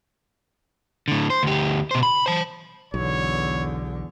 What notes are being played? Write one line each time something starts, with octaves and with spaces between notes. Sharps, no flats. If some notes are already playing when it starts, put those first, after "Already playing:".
A2 D3
C5
D2 G4
B2 C5
B5
C5 A5
B1 E2 D3 C#5